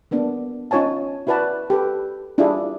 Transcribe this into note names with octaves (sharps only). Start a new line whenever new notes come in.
A#3 B3 D4
C#4 D#4 F4 C#5 G#5 A5
E4 F#4 B4 D5 A5
G4 A4 B4
D4 E4 F4 G4 G#4